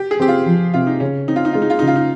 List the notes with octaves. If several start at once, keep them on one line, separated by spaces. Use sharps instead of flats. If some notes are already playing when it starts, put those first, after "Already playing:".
Already playing: G4
G#4
C4 G4
F4
F3
C3 F4
D#4
C#3 C#4
C4 D#4
F4
D#4
G#3 F4
D#4
F4
C#3 D#4
F4
D#4